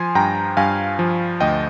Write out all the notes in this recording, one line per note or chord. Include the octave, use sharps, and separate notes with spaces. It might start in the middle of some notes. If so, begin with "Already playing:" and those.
Already playing: F3 G#5 C6
G2 G5 A#5
G2 F5 G#5
F3
D2 D#5 G5